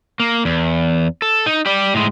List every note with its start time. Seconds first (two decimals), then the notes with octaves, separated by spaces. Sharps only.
0.20 A#3
0.45 E2
1.22 A4
1.46 D#4
1.66 G4 D5
1.94 A2 G#3